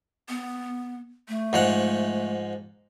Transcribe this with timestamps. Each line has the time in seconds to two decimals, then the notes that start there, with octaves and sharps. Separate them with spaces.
0.29 B3
1.28 A3
1.53 G#2 F3 F#5